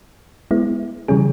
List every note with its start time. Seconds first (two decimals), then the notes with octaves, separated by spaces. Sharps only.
0.51 G#3 B3 E4
1.08 C#3 E3 G3 C#4 G#4